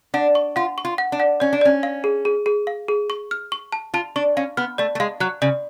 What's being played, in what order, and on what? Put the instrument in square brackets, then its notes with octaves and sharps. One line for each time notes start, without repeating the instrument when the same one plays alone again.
[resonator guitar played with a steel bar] D4 [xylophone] F#5
[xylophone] C#6
[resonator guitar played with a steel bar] F4 [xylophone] F#5
[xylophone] C#6
[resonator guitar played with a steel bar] F4
[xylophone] F#5
[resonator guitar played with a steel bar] D4
[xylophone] F#5
[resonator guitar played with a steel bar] C#4 [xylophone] D5
[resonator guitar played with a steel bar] D4
[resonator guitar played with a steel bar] C#4 [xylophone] D5
[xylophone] F5
G#4
G#4
G#4
F5
G#4
C#6
F6
C#6
A5
[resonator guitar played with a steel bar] F4 [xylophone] A5
[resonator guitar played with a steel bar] D4 [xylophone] C#6
[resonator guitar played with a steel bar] C#4 [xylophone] F5
[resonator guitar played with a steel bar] B3 [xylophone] F6
[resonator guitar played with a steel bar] A3 [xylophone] D5
[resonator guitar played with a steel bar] A3
[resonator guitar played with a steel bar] G#3 [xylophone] F5
[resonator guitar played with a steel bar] F#3 [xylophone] F#6
[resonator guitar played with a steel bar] C#3 [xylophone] D5